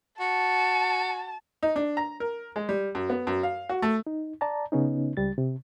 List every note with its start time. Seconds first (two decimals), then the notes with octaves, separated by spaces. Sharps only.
0.20 F#4 A5 C#7
1.63 D#4
1.76 D4
1.97 A#5
2.20 A#4
2.56 G#3
2.69 G3
2.95 F#2
3.10 B3
3.27 F#2
3.43 F5
3.69 F#4
3.82 A3
4.07 D#4
4.41 D5 A5 A#5
4.72 C#3 B3 C#4 D#4
5.17 C#2 G3 A6
5.38 C3